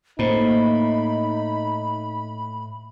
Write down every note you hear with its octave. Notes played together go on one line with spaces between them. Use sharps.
A2 A#3 D#4 C5 B5